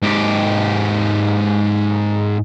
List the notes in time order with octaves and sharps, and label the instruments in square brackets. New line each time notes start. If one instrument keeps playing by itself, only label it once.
[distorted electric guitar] G#2 G4